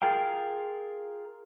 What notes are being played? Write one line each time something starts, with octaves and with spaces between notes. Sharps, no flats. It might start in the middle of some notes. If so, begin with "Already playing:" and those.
F4 G#4 A#4 F5 G5